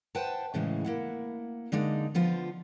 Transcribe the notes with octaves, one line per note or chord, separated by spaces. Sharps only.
B4 C5 F#5 G5 A5
A2 C#3 E3 G#3
A#3 E4 F#5
D3 G#3 A#3 D4 D#4
D3 F3 B3 F4 C5